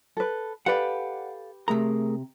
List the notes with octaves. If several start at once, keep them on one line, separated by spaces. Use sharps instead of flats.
A4 B4
G4 A4 B4 D5 F5 F#5
C3 A3 G#4 A#4 A#5